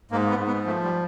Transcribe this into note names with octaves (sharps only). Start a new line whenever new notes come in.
G#2 A#3
B3
G#2
B3
F3 A3
G3